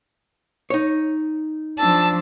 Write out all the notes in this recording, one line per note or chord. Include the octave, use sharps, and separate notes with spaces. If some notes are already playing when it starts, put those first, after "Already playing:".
D#4 C#5
F3 D4 A5 E6